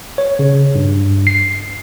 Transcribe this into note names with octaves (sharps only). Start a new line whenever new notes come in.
C#5
C#3
G2
C7